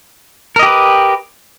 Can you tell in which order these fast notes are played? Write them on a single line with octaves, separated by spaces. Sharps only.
A#4 D#5 G4 B4